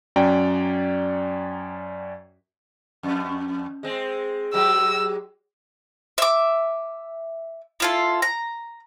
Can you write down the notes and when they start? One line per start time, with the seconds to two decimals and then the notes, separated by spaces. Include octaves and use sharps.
0.16 F#2 C#4 F#4 D5 G5 A#5
3.03 F2
3.83 G#3 C4
4.54 F#3 G#3 G4 E6
6.18 E5 D6
7.80 E4 F4 A4
8.22 A#5